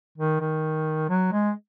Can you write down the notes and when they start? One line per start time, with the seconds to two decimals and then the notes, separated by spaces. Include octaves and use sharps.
0.18 D#3
0.40 D#3
1.09 F#3
1.32 G#3